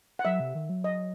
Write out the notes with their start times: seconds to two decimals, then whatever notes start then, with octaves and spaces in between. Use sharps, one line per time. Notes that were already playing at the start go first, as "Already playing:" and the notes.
0.19 F#5
0.25 F#3 E5
0.40 C3
0.55 D#3
0.69 F#3
0.84 D#5